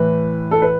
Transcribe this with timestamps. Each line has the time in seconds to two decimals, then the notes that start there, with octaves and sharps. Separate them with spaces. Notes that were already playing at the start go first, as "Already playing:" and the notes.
Already playing: A2 E3 B4
0.51 A4
0.62 B4